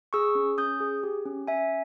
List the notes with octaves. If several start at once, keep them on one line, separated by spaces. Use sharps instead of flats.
G#4 C#6 E6
C#4
C#4 D#6 G6
G#4
G4
C#4
C#4 E5 G#5